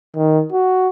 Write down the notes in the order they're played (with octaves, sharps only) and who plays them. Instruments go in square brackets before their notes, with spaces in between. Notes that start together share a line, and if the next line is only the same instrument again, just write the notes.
[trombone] D#3
F#4